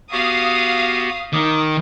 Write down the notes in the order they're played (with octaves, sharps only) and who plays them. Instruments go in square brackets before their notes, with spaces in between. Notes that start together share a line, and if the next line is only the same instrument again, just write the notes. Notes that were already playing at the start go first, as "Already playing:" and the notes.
[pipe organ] B3 F#4 G4 [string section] F5 D#6
[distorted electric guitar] D#3 [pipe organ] D6 D#6